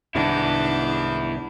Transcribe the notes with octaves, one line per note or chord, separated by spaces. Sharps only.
C2 G#2 D#3 B3 D4 E4